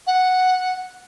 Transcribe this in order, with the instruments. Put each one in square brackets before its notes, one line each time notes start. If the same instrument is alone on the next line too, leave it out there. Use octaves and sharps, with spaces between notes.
[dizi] F#5